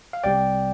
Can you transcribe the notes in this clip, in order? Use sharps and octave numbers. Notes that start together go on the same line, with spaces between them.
F5
C2 C3 G3 C4 D5 G5